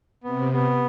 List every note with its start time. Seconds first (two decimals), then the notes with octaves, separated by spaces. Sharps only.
0.24 C3 B3
0.53 B3